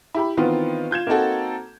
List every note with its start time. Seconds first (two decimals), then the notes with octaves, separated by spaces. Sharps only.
0.14 E4 G4 B5
0.37 D#3 E3 B3 C4 F4
0.91 F4 G6 G#6 E7
1.07 A#3 C4 D#4 F#4 A4